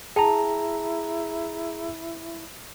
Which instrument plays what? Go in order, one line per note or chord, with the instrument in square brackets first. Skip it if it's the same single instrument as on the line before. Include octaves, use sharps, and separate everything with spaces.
[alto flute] E4 [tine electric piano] G#4 A#5 [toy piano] G5 A5